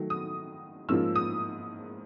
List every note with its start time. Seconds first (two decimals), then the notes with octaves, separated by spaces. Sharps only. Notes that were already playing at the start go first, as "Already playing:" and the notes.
Already playing: D#3 F#3 A3
0.10 D#6
0.89 G#2 F3 A#3 C#4 F4 E6
1.16 D#6